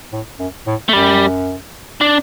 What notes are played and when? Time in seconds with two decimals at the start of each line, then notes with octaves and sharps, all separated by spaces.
0.12 A2
0.39 F#2
0.67 A2
0.89 A3
0.93 F#2 G3
2.01 D4